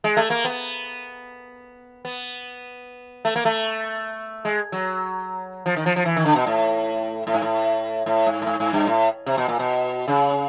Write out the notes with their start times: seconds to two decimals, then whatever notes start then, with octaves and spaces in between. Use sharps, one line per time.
0.04 G#3
0.17 A3
0.30 A#3
0.45 B3
2.05 B3
3.25 A3
3.36 A#3
3.45 A3
4.45 G#3
4.72 F#3
5.66 F3
5.76 D#3
5.86 F3
5.96 F3
6.05 E3
6.17 D#3
6.25 D3
6.36 B2
6.47 A2
7.27 A2
7.34 G#2
7.42 A2
8.06 A2
8.27 G#2
8.42 A2
8.47 G#2
8.60 G#2
8.73 G2
8.87 A2
9.26 C3
9.37 B2
9.48 A#2
9.59 B2
10.08 C#3